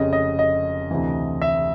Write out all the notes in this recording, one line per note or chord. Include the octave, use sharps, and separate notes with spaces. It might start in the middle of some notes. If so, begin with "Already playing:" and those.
Already playing: F1 F2 C#3 D#5
D#5
D#5
D2 C3 E3
E5